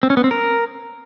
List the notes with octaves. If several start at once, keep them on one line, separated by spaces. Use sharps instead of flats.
C4
C#4
B3
C4
A#4